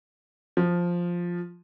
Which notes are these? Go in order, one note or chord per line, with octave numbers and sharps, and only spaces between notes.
F3